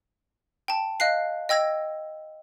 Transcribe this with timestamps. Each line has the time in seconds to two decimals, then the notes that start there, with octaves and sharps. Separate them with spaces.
0.68 G5 A5
1.00 D#5 F5 F#6 C7
1.49 D#5 G5 E6 G#6 A#6